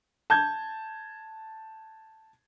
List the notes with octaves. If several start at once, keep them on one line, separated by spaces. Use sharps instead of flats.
A5 G6 G#6